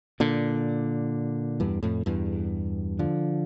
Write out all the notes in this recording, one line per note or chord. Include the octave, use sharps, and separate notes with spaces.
A#2 D3
E2 G2
F2 A2
E2 G2
D3 F3